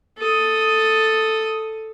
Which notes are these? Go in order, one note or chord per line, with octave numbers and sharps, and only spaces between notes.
A4 D#6